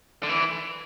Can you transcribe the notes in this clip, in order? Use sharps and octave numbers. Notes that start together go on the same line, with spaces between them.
D3
E3